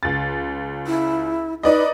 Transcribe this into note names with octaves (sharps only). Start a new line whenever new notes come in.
C#2 A6
E4
D#4 B4 D5 D#5